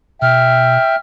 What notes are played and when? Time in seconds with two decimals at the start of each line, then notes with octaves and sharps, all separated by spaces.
0.22 B2 E5 G5 F6